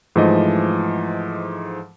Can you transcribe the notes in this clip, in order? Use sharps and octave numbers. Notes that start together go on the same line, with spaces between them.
G#2 E3 F3 A3 D#5 D6